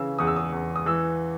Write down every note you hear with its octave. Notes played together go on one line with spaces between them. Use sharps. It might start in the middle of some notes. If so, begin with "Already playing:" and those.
Already playing: C#3 E3 E6
E2 D#6
E6
D#6
E2
D#6
E3 E6